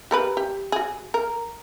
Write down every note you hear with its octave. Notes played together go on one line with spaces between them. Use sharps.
G4 A#4 B4
G4
F#4 G#4
A#4